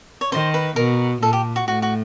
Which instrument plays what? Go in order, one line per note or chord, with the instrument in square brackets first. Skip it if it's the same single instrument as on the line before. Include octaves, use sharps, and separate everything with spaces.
[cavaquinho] C#5
[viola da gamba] D#3 [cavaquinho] C5
[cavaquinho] B4
[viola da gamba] B2 [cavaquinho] A#4
[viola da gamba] A#2 [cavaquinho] A4
[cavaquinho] G4
F#4
[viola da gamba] A2 [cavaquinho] F#4
[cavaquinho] F#4